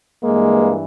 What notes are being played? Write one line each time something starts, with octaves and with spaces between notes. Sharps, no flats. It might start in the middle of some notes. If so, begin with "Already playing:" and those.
G2 E3 G#3 A#3